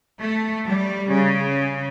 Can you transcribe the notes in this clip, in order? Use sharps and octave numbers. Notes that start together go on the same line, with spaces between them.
A3
G3
C#3